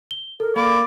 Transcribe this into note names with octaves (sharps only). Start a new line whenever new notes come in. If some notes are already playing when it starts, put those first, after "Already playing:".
G7
A4 A#4
A#3 D5 B5